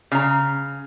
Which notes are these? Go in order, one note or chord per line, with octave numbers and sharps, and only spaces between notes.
C#3 A#5